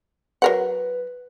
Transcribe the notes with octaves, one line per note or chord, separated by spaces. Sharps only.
F#3 A#4 B4 F#5